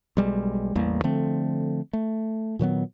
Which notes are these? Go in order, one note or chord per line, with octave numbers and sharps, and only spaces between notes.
B1 G3 G#3
A1 E2 G3 A#3
D3 F3 A3 C4
A3
A#2 D#3 F#3 B3